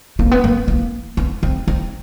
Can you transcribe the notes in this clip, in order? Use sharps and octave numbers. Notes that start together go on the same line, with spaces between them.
A#3
B3
A#3
A#3
B3
C4
C4